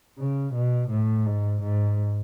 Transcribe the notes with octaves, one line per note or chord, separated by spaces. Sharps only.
C#3
B2
A2
G#2
G#2